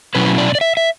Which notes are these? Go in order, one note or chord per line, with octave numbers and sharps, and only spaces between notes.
B2 F#3 C#4 E4 B4
D5
D5
E5
E5